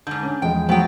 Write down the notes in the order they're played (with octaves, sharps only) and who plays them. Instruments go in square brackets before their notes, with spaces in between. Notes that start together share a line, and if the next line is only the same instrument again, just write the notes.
[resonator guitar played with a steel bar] G#2 D3 [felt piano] G6
[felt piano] C#4
[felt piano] E2 F3 G#3 [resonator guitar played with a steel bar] G5
[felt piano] F3 F#3 [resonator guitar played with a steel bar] B3 C4 G5